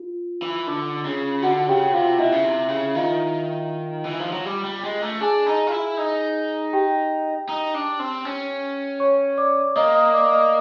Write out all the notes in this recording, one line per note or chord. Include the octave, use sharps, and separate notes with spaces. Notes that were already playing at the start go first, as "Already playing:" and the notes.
Already playing: F4
E3
D3
C#3
D3 F#4 F#5
C#3 G4 G5
C3 F4 F5
B2 E4 E5
C#3
C3
C#3
D#3 F4 F5
E3
F3
F#3
G3
G3
G#3
A3
D4 G#4 G#5
D#4
F4
E4
D#4
G4 G5
D#4
D4
C4
C#4
C#5 C#6
D5 D6
A#3 D#5 D#6
D#5 D#6
D5 D6
D#5 D#6